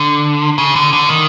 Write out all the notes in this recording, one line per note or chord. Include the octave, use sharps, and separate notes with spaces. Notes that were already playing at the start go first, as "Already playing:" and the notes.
Already playing: D3
C#3
D3
D3
D#3